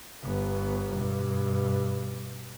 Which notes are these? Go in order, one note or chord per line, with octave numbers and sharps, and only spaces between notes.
G1 B3
G2 B2